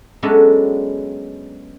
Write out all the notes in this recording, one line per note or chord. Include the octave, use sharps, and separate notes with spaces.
F#3 G#3 B3 C#4 D4 A4